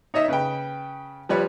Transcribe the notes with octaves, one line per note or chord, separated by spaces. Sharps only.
D#4 C#5 D#5 E5
C#3 B4 G5
F3 G3 B4 C#5